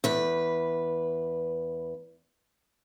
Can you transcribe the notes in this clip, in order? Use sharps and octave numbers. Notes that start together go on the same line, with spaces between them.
E2 B4